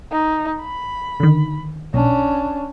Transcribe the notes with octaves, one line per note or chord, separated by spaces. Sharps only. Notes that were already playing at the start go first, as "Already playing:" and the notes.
D#4
B5
D3 D#3
B1 C#4 D4